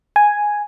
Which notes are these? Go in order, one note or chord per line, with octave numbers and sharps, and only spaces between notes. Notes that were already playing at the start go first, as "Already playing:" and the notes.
G#5